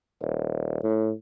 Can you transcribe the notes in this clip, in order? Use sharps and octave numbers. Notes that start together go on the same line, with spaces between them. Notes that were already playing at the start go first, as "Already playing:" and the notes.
D#1
A2